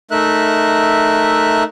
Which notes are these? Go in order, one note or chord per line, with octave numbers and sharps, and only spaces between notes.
A3 D#4 A#4 E5 F#6